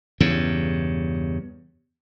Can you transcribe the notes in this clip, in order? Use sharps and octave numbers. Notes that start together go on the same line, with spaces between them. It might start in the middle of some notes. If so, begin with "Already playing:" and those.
E2 G2 C#3